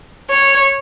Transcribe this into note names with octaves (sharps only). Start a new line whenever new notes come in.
C#5